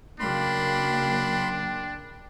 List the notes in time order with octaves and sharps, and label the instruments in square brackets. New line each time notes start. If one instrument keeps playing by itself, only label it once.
[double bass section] C#3 F#3 A#3 [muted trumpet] D4 [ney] G5 [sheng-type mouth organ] B5 C6